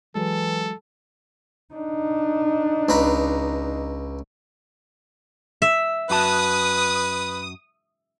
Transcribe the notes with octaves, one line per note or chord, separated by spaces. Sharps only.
E3 F#3 G#3 A4
D4 D#4
C#2 B4 A#5
E5
F#2 F#4 B4 A5 D#6